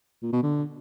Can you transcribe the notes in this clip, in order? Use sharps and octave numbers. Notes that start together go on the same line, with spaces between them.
A#2
B2
D3